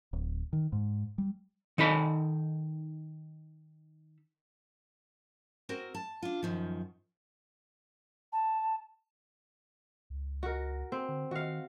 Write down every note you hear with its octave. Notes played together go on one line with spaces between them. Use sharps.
D1
D#3
G#2
G3
D#3 D#4 A4 B5
C4 F#4 A#4
A5
D4 F4
F#2 D#3 F3
A5
C#2
F#4 A#4
C4
D3
D#3 F#4 F5